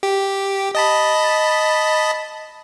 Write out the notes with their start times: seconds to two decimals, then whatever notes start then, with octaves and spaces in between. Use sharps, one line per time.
0.03 G4
0.75 D#5 A5 B5